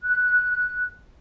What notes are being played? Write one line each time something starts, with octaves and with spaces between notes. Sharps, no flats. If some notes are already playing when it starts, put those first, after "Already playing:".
F#6